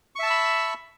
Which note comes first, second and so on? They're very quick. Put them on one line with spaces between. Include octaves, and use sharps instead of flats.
C#6 E5 A5 E6 B5